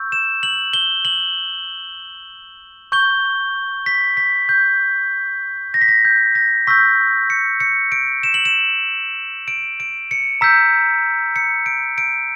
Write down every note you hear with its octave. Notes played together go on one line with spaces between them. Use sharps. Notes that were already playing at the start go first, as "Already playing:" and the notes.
Already playing: C#6 E6 G6
E7
F#7
G7
F#7
C#6 G6 G7
B6
B6
G6
A#6
B6
A#6
G6
A#6
C#6 E6 G6 B6
C#7
C#7
D7
E7
F#7
E7
D7
D7
C#7
A#5 E6 G6 B6
C#7
D7
D7